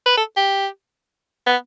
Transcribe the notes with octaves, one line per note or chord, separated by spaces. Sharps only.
B4
A4
G4
B3